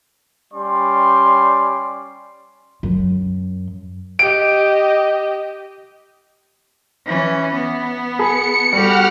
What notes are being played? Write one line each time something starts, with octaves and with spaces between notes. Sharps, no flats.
G3 C#4 D5 C6
F#2
G4 D#5 D7
E3 C#4
B3
G#4 A5 B5 C#7
G3 F#4 G4 A4 F#5 F6